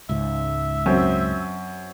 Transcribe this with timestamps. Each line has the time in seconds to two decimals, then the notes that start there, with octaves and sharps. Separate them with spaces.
0.09 C#2 G#2 E5
0.86 F#2 C4